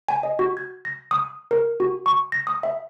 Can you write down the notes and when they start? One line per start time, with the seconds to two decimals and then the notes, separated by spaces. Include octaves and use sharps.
0.09 G#5
0.23 D#5
0.39 F#4
0.57 G#6
0.85 A#6
1.11 D#6
1.51 A#4
1.80 F#4
2.06 C#6
2.32 A#6
2.47 D#6
2.63 E5